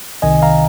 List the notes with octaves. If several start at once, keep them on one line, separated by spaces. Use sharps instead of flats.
C2 C3 D#3 D#5 G#5
F5 A#5